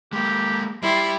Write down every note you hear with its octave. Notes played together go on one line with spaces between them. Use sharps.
G#3 A#3 G4
G3 E4 G4 C6